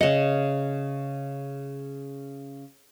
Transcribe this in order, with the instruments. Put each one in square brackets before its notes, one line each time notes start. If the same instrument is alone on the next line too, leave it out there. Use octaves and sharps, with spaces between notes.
[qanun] C#3 F#5 [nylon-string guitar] D#5